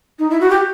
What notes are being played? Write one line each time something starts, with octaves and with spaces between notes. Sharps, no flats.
D#4
E4
F#4
G4